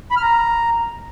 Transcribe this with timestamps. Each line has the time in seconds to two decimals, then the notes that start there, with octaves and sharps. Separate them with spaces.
0.11 B5
0.17 F6
0.22 A#5